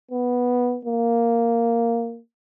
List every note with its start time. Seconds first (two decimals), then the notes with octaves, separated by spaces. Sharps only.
0.11 B3
0.85 A#3